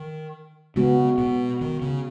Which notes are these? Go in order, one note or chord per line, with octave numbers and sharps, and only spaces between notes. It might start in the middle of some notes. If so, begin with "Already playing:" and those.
Already playing: D#3
C#3 G#3 B3 F#4
B2
D#3
C#3